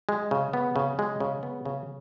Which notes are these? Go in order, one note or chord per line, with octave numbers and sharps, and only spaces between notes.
G#3
C#3
B3
C#3
G#3
C#3
B3
C#3